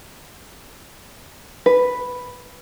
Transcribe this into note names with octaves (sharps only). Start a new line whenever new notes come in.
B4